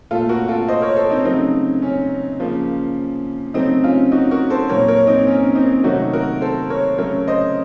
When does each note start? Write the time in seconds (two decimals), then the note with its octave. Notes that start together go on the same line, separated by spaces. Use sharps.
0.11 A#2 A3 F4 A4
0.29 F#4 A#4
0.48 F4 A4
0.68 C5 D#5
0.82 A#4 C#5
0.96 A4 C5
1.11 C4 D#4
1.25 C#3 F#3 A3 C4 D#4
1.82 C#4
2.40 C#3 F3 A#3
3.54 C#3 F#3 A3 C4 D#4
3.83 C#4 F4
4.12 D#4 F#4
4.31 F#4 A#4
4.50 A4 C5
4.69 A#2 F#3 A#3 A#4 C#5
4.88 A#4 C#5
5.07 C4 D#4
5.27 C#4
5.55 C4 D#4
5.84 C3 D#3 F#3 A3 D#4 F#4
6.13 F#4 A#4
6.41 A4 C5
6.70 A#4 C#5
6.98 C#3 F#3 A3 A#4 C#5
7.27 C5 D#5